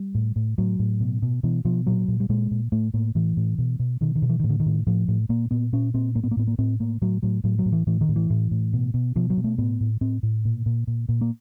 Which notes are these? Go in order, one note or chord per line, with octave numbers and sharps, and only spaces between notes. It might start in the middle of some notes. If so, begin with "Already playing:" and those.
Already playing: G3
A2
A2
A2 F#3
A2
B2
B2
B2 E3
B2 F3
A#2 F#3
A#2
G3
A#2 G#3
A#2
A2 A3
A2 A#3
A2 E3
A2
B2
B2
B2 D#3
D#3
B2
E3
A2 D#3
D3
D#3
A2
A2 F3
A2
A#2 A#3
A#2 B3
A#2 C#4
A#2 C4
A2 A#3
B3
A#3
A2 B3
A#3
A2 C4
A2 A#3
A2 F#3
A2 F#3
A2 F#3
F#3
A2
E3
A2 E3
D#3
A2
E3
A2
A2
B2
B2
B2 F3
F#3
B2
A3
A2 B3
A2
A2 C4
A2
A#2
A#2
A#2
A#2
A#3